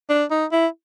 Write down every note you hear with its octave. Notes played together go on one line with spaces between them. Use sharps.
D4
D#4
E4